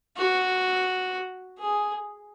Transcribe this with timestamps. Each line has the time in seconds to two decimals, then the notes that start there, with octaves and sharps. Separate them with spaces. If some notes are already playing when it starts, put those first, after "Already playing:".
0.17 F#4
1.59 G#4